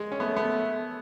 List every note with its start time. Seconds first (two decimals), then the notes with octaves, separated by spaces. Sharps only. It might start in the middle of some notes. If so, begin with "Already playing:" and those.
Already playing: G#3
0.12 C#4
0.20 A3 B3
0.36 B3